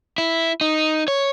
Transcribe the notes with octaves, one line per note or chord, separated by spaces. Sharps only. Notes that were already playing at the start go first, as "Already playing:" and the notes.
E4
D#4
C#5